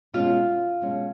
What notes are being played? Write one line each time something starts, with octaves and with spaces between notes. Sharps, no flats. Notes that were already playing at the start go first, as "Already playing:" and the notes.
B2 G#3 C#4 F4
B2 G#3 C#4